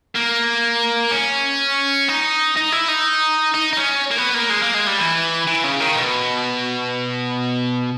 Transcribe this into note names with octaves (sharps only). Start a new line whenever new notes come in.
A#3
C#4
D#4
D#4
E4
D#4
D#4
D#4
C#4
A#3
B3
A#3
G#3
A#3
G#3
G3
E3
E3
C#3
D#3
B2